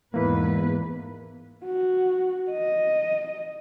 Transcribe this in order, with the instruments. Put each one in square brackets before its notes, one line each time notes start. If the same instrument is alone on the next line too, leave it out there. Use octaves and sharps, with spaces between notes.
[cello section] E2 G#2 B4 [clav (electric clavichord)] E3 A#3
[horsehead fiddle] F#4
D#5